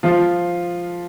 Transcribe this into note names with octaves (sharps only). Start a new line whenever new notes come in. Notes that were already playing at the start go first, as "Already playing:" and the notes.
F3 F4